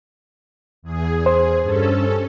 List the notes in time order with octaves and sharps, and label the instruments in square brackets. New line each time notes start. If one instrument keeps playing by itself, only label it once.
[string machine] E2 G#4
[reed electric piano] C5
[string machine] G2 C#4 A4